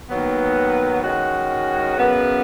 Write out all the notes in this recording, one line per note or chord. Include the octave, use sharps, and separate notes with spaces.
D#2 D#3 F#3 B3
D#3 G#3 C#4 F#4
F#2 C#3 B3